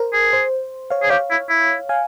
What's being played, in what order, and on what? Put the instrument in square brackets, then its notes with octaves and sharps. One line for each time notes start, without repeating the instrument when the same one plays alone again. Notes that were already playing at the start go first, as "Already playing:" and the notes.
Already playing: [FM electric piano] A#4 C5
[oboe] G#4
[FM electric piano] C5
C#5 F5
[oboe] G#4
[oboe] G4 [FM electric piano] C#5 F5
[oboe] E4
E4
[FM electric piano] F5 G#5